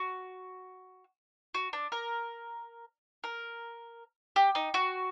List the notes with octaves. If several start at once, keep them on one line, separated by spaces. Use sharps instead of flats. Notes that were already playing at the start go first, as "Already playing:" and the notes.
Already playing: F#4
F#4
D4
A#4
A#4
G4
D#4
F#4